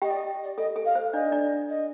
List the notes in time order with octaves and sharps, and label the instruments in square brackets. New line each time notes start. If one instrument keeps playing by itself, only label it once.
[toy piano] G4 G5 [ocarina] D#5
[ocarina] D5
D#5
D5
[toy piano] A4 [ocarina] D#5
[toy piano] A4
[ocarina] F5
[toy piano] C5
[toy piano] D4 D5 [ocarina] D#5
[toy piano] D4 D5
[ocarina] D#5